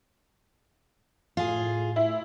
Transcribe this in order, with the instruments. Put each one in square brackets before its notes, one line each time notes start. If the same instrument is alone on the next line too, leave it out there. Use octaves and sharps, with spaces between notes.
[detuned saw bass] A2 [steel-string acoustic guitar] F4 G#4
[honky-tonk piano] E4